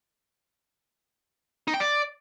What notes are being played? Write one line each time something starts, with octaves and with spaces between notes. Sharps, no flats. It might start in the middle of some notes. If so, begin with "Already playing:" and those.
D#4
G5
D5